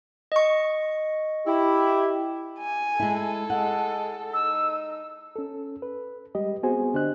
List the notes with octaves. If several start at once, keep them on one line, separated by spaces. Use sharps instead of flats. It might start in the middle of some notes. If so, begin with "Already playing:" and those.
D#5 C#6
E4 G4
G#5
G#3 E4 A4
G#3 F#5
D#4 E6
C#4 A4
B4
G3 G#3 G4 D#5
B3 C4 F#4 G#4 C5 G#5
D3 D4 G4 C5 D#5 F#6